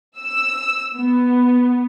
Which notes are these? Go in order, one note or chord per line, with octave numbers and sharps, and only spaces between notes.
E6
B3